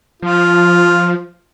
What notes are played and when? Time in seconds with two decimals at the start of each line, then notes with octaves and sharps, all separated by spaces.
0.22 F3 F4